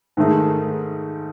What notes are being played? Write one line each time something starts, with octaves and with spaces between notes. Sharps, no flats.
G#2 D#3 A3 D#4 G#4